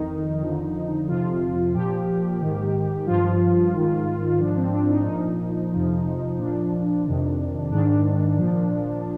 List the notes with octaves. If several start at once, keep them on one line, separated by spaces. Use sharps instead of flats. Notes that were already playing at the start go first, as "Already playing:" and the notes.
Already playing: F2 D#3 D#4
F2 D3 F3
F2 C3 F3 F4
A#2 F3 G4
G#2 D#3
G2 F3 F4
G#2 D#3
G#2 F3 D4
C4
D4
D#4
A#2 F3 D#4
F2 C3 F3
A#2 F3 D4
F2 C3 D#3
G#2 D#3 D4
A#2 F3